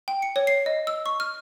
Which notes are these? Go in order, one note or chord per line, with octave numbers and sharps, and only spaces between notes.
G5
C#7
C#5
C7
D#5
E6
C#6
F6